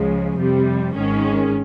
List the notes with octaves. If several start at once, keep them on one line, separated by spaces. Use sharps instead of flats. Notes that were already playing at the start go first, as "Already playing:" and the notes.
Already playing: C#2 C#3 F3 G#3
F2 C3 G3
G#1 G#2 D#3 G#3 C#4